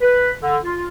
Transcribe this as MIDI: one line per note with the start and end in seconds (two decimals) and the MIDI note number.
0.01 0.31 71
0.41 0.56 50
0.64 0.87 65